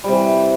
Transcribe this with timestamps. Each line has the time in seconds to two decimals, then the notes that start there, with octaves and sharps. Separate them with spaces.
0.04 G3
0.08 C3
0.12 E3